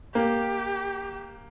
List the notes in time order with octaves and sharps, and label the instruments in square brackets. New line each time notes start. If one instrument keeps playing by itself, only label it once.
[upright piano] A#3 [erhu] G4